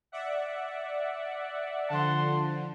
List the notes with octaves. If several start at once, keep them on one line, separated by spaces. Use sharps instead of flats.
D5 E5 F#5
D3 F3 F#5 A5 C6